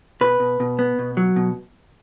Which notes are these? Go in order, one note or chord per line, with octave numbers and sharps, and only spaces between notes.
B2 B4
B2
B2
B3
B2
F#3
B2